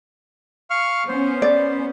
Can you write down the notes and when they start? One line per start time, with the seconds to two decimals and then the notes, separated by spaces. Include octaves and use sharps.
0.70 F5 C#6 F6
1.08 B3 C#4 C5
1.42 D5